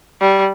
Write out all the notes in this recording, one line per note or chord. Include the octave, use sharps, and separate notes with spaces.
G3